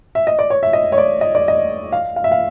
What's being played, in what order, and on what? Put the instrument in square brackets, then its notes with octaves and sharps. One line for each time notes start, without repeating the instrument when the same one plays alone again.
[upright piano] E5
D#5
D5
C#5
E5
D#5
C#5
D5
D#5
D5
D#5
F5
F5
E5
F5